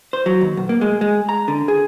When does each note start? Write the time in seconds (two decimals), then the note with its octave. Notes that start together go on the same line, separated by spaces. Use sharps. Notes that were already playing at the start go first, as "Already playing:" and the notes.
0.13 C5
0.26 F#3
0.41 D#2
0.57 B1
0.69 A#3
0.81 G#3
1.01 G#3
1.29 A#5
1.48 D3
1.68 G#4